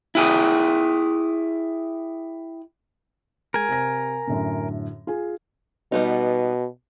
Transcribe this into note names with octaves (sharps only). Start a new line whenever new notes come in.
E4 G4 G#4
G#3 A#4 G#5
C3 A#6
F#2 A2 D3
F4 G#4 G#5
B2 G3 B3 D#4